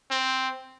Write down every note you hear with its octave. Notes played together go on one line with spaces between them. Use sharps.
C4